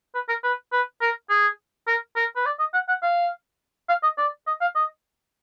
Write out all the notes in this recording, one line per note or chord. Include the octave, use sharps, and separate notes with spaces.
B4
A#4
B4
B4
A#4
G#4
A#4
A#4
B4
D5
D#5
F#5
F#5
F5
F5
D#5
D5
D#5
F5
D#5